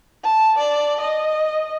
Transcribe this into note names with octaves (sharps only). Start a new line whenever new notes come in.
A5
D5
D#5